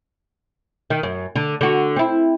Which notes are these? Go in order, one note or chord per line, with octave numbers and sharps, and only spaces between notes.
D#3
F#2
D3
D3 F#4
C4 E4